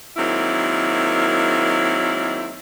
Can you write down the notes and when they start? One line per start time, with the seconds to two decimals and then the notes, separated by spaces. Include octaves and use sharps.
0.17 D#3 F#3 G#3 A#3 C4 E4